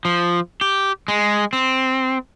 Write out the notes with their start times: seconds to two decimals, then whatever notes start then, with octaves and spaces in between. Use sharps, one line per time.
0.05 F3
0.61 G4
1.08 G#3
1.53 C4